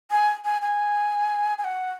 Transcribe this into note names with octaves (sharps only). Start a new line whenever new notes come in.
G#5
G#5
G#5
G#5
F#5